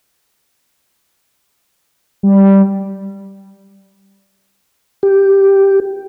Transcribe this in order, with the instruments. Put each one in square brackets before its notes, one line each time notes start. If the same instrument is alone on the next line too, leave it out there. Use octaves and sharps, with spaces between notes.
[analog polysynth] G3
[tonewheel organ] G4